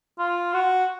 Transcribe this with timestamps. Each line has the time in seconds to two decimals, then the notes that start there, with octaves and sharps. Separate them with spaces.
0.19 F4
0.54 F#4